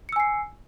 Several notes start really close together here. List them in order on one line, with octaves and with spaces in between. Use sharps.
C#7 E6 G#5 C7